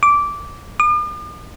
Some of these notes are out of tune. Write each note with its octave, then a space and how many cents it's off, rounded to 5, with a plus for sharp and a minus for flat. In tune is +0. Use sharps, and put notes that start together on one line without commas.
D6 -15
D6 +45